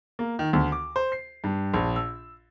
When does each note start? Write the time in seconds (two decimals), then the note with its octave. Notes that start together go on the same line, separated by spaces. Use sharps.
0.19 A#3
0.39 D#3
0.53 D2
0.72 D6
0.96 C5
1.12 C7
1.44 G2
1.74 A#1
1.96 E6